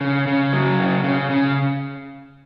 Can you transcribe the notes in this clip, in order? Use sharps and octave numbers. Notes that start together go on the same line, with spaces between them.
C#3
C#3
F#3
C#3
C#3
C#3